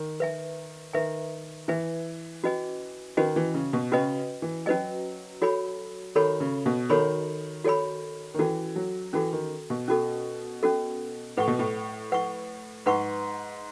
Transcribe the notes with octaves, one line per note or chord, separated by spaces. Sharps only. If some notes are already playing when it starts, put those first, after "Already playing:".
Already playing: D#3
B4 E5 G#5
D#3 B4 E5 G#5
E3 B4 E5 G#5
C#4 F#4 B4 D#5 G#5
D#3 C#4 F#4 B4 D#5 G#5
E3
C#3
B2
C#3 C#4 F#4 B4 D#5 G#5
E3
F#3 C#4 F#4 B4 D#5 G#5
F#4 A4 C#5 G#5 B5
D#3 F#4 A4 C#5 G#5 B5
C#3
B2
D#3 F#4 A4 C#5 G#5 B5
F#4 A4 C#5 G#5 B5
D#3
E3 C#4 F#4 A4
F#3
E3 C#4 F#4 A4
D#3
B2
C#4 F#4 A4
C#4 F#4 A4
A2 B4 F#5 C#6
B2
A2
B4 F#5 C#6
G#2 B4 F#5 C#6